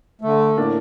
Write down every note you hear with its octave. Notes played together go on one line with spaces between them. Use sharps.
D3 A3
A2 A#3 D4